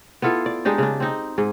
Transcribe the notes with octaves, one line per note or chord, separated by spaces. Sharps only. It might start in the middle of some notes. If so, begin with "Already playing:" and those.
B3 E4 F4 A4
D5
G#3 D4 D#4 G4
C#3 D4
C4 D#4
G#2 G#4